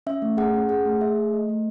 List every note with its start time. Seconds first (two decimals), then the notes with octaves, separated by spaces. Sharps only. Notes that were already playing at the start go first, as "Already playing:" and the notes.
0.07 C#4 E5
0.22 A3
0.37 G#4 F#5
0.54 C#4
0.69 G#4 F#5
0.86 A3
1.01 G#4 E5
1.17 A3
1.33 A3 D#5
1.49 A3